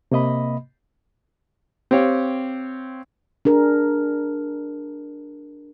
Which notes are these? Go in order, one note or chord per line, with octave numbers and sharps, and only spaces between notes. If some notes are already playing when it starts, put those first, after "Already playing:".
C3 A#3 D#5 B5
C4 G4 C#5 F5
D4 G#4 A#4